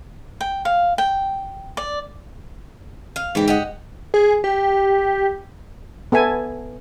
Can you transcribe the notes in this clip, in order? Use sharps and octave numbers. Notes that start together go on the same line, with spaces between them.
G5
F5
G5
D5
F5
G#2 E3 G4
G4 D#5 F#5
G#4
G4
B3 A4 E5 G#5